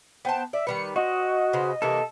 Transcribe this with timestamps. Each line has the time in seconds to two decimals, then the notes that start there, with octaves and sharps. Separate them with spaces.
0.25 B3 C5 G5 A5
0.53 D5 E5
0.67 D#3 G3 B4 C#7
0.96 C4 F#4 D#5
1.53 C#3 B4 C5
1.82 C3 E3 A#3 A4